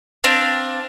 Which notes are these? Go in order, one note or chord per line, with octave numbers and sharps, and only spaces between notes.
C4 D4 F5